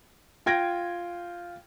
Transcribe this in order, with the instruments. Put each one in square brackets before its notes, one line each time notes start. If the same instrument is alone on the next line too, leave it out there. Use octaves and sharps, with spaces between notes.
[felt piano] F4 G5 G#6 A#6 D7